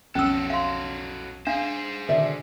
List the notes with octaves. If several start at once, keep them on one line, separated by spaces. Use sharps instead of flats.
B1 F2 F#3 C#4 A4 E6
F5 C6
D4 G#4 C5 F5
B2 D3 D#3 D5 E5